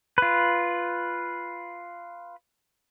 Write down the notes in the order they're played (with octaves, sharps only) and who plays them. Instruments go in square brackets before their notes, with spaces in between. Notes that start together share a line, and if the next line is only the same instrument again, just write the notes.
[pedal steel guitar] F4 B4